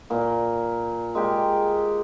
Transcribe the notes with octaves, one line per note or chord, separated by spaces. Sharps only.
A#2 A#3
G#3 A#3 G4